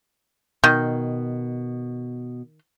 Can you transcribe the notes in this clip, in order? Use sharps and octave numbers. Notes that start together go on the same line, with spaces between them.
B2 D#3